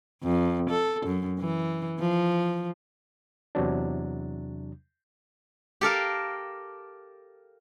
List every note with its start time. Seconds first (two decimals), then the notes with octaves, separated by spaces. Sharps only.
0.23 F2
0.69 A4
1.06 F#2
1.39 E3
2.00 F3
3.55 E2 C3 F#3 D4
5.81 G4 A4 A#4 F5